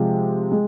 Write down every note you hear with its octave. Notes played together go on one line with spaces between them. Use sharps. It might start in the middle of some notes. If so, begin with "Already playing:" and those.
Already playing: C3 F3 G#3
G#3